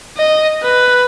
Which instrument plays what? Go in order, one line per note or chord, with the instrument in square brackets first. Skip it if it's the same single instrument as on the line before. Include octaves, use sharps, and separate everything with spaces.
[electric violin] D#5
B4